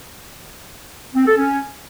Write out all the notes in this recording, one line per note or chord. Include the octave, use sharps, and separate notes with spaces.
C4
A4
C#4